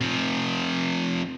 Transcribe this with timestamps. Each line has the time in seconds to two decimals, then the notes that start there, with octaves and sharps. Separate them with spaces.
0.01 C3 F3